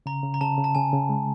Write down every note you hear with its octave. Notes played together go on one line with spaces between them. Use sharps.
C#3 A#5
C#3
A#5
C#3 A5
C#3
A5
C#3 G#5
C#3
G#3